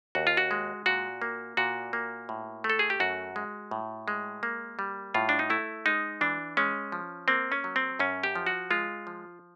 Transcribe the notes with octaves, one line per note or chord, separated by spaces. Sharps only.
D#2 F#4
F4
F#4
G#3
A#2 F#4
A#3
A#2 F#4
A#3
A2
A3
A4
G#4
G4
F#2 F#4
G#3
A2
G#3
A#3
G3
A2 F4
D4
D#4
A3 E4
G#3 D#4
E3 D4
G#3 C#4
F3
A#3 C4
C#4
F#3
C4
F#2 C#4
G4
F3
F#4
G#3 F4
F3